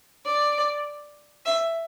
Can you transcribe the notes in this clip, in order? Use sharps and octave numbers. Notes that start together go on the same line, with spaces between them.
D5
E5